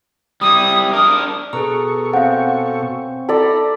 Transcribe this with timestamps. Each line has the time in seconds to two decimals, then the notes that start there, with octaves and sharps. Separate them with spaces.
0.41 G3 E4 D#6
0.93 D4 A#4 D#6
1.53 B2 G#4 A4 B4 A#5 C#6
2.13 C4 C#4 C5 F5 F#5
3.29 E4 A4 D5 A#5 B5